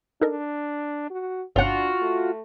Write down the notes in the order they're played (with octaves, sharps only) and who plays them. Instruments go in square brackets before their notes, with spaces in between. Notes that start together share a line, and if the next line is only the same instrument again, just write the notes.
[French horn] D4 [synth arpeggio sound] D#4 A4 A#4
[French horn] F#4
[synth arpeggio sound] G1 C#4 F#5 [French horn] D4 [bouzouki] F4 F#4
[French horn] A3